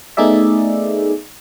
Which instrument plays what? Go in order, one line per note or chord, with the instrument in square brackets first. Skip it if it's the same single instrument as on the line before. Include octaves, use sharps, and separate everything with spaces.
[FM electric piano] A3 B3 D#4 G#4 D5 E5